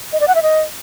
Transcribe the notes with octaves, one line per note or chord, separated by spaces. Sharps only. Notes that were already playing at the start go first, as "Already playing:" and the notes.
D#5
D5
F#5
E5
D#5